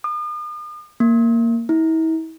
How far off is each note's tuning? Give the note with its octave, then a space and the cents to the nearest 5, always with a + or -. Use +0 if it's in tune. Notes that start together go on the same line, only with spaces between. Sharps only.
D#6 -45
A#3 -10
E4 -40